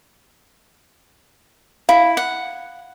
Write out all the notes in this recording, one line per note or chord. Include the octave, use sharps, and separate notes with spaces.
E4 F5
F#5